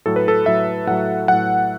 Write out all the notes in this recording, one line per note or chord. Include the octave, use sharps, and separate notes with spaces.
A2 F#3 A4
B4
A4
A2 F#3 E5
A2 F#3 F#5
A2 F#3 F#5